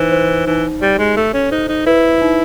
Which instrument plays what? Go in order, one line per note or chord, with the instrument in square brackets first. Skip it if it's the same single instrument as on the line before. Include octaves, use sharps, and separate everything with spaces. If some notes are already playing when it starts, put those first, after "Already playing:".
Already playing: [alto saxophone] E3 [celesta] D#4 C5
[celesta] C5
[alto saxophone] E3 [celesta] D#4
[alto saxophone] G3 [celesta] G4
[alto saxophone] G#3
[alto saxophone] A3 [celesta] A4
[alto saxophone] C#4
[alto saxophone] D#4 [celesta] C5
[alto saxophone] D#4
[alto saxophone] E4 [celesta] B4
[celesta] D#4